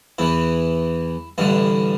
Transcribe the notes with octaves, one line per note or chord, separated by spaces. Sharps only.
E2 E3 E4
A1 G2 D3 E4